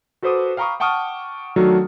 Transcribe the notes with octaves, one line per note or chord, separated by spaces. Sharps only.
F#4 A4 B4 C5 D6 D#6
F5 G5 A#5 B5 C#6 D#6
F#5 G5 A5 C#6 D#6 F6
D#3 F#3 A3 D4 F#4 A4